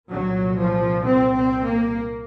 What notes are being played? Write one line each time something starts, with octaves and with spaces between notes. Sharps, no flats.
C2 A#2 F#3
F3
C4
C4
A#3